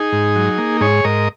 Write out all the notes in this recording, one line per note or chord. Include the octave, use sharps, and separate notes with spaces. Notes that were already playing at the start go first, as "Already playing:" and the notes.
Already playing: D#4 G#4
G#2
F#3
A#3
G#2 G#4 C#5
G#2 A#4 D#5